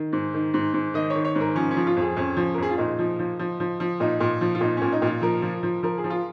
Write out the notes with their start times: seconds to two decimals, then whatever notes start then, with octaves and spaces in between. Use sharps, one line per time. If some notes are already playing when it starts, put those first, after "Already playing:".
Already playing: D#3
0.13 G#2
0.34 D#3
0.54 G#2
0.74 G#2
0.94 D#3 D#5
1.10 C#5
1.15 D#3
1.25 C#5
1.35 G#2
1.41 A#4
1.55 F3 C#4
1.71 C#4
1.77 F3
1.87 F4
1.97 F2 G#4
2.17 F2 C#4
2.37 F3
2.54 A#4
2.58 F2 G#4
2.70 F4
2.77 A#2 D#4
2.99 F3
3.19 F3
3.39 F3
3.60 F3
3.80 F3
4.00 A#2 D#4
4.20 A#2
4.41 F3
4.55 F4
4.61 A#2 D#4
4.77 A#2 C#4
4.92 D#4
5.02 A#2
5.07 F4
5.22 F3 A#4
5.42 F3
5.63 F3
5.83 F3 A#4
5.98 G#4
6.04 F3
6.10 F4